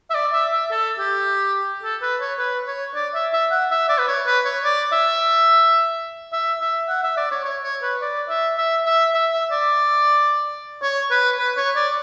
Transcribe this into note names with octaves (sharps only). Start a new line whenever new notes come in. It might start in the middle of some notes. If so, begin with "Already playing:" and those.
E5
D5
E5
E5
A4
G4
A4
B4
C#5
B4
C#5
D5
E5
E5
F#5
E5
D5
B4
C#5
B4
C#5
D5
E5
E5
E5
F#5
E5
D5
C#5
C#5
C#5
B4
D5
E5
E5
E5
E5
E5
D5
C#5
B4
B4
C#5
D5